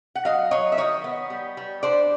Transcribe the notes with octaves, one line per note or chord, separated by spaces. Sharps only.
F#5
F#3 D#5 F5
F#3 C#5 D#5
E5
D#3 C#5 D#5
B3
G3
G3
D4 C5 D5